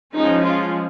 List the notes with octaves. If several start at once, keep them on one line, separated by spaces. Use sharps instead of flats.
F3 G#3 C#4 D#4
F4